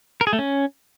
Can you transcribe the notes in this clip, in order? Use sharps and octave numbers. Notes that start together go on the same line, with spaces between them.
A#4
G#4
A3
C#4